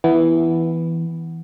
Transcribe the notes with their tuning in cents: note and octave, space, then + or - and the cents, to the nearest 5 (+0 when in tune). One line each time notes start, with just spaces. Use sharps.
E3 +0 B3 +0